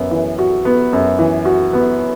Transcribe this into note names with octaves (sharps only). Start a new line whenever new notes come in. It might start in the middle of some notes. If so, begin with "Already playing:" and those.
Already playing: F#2 B3
E3
F#4
B3
F#2
E3
F#4
B3